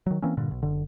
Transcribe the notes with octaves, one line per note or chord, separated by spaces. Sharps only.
D#3 F#3
E3 A#3 C4 C#4
G2 A#2 D3
B1
F#1 D3